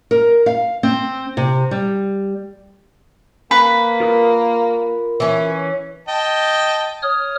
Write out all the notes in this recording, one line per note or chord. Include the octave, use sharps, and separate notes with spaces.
A#4
F5
C4
C3
G3
A#3 B4
F4 A#4 D#6
E3 C#4
D#5 G5 A5
C#5 D#6 F6